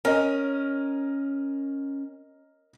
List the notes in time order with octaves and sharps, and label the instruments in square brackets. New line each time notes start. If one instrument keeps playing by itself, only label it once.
[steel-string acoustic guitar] C#4 [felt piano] A#4 D#5